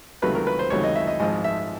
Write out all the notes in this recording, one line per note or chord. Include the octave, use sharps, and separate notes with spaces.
C#2 C3 D#3 F#3 A3 B4
A#4
B4
C5
C#2 C3 D#3 F#3 A3 C#5
D#5
E5
D#5
G#1 G#2 F3 G#3 D#5
E5